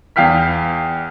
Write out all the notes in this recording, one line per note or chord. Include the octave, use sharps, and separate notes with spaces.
E2 F5 G5 F6 B6